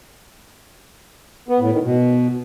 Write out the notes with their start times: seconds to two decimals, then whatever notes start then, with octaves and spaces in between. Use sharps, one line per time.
1.49 B3
1.60 A2
1.71 D#3
1.83 B2